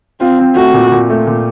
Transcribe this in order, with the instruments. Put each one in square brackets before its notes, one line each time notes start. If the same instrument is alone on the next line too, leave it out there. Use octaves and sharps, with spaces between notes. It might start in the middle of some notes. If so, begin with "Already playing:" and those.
[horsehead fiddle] C4 [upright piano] F4
[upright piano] C4
[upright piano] A3 [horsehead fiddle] F#4
[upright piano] A#2
A#2
A3
A#2